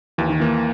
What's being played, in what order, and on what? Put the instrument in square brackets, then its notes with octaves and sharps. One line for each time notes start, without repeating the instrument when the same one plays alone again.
[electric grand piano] D#2 [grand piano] E3
[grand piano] D#3
[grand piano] E3 [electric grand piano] A#3